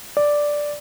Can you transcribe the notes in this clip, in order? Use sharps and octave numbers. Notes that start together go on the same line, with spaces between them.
D5